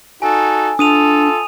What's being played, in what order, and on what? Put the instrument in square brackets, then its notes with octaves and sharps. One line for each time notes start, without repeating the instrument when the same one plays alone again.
[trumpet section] D#4 F#4 A4 [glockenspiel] G#5
[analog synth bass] D4 [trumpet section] F4 A4 [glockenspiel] D#6 D#7 F7